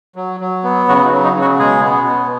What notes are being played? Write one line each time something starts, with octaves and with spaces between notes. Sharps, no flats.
F#3
F#3
B3
C#3 F#3 F#4
D#4
F#3
D#4
C#3
F#3 F#4
B2 G#3 G#4
B3
B2